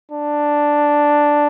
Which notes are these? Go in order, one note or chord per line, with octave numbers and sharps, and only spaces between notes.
D4